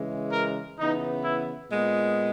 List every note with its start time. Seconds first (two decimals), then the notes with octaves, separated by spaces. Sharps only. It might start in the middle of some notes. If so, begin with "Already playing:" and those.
Already playing: C#3 E3 G#3
0.32 A#4
0.79 C#3 E3 B3 D#4
1.24 E4
1.70 A#2 G#3 B3